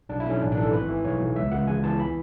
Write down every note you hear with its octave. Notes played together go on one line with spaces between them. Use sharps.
B1 D4
E4
B1
C#4
A1 D4
D4
E3 A4
G#1 B4
E3
B1 C#5
B1
C#2 E5
C#2 F#5
E2 G#5
E3 A5
B5